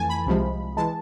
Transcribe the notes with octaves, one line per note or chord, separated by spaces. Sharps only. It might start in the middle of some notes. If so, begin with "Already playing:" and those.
Already playing: F2 E3 A3 G#5 A5
B5
C2 C3 F3 G#3
E3 G#3 A5